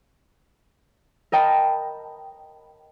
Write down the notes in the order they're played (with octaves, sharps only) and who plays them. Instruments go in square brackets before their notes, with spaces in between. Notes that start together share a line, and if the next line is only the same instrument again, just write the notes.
[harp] A#4 D#5 G5 A5 B5